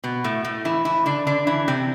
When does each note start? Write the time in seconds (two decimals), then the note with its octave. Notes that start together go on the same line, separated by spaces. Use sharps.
0.04 B2 B3
0.24 A2 A3
0.45 A2 A3
0.65 E3 E4
0.85 E3 E4
1.06 D3 D4
1.27 D3 D4
1.47 E3 E4
1.68 C3 C4